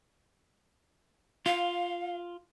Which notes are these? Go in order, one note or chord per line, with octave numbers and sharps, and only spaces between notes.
F4 F5